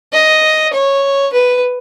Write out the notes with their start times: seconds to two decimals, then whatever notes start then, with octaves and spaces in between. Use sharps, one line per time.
0.13 D#5
0.73 C#5
1.33 B4